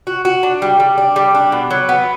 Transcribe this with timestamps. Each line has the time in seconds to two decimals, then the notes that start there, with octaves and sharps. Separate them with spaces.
0.07 F#4
0.25 F#4
0.43 D4
0.62 G3
0.80 G3
0.98 D4
1.16 G3
1.35 D4
1.52 B2
1.71 F#3
1.89 B3